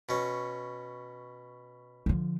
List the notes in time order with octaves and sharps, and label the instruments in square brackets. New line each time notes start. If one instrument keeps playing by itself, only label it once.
[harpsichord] B2 C#4
[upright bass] D3 F3